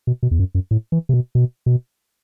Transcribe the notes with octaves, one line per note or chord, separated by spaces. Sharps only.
B2
B2
E2
F#2
F#2
A2
E3
C3
B2
B2
B2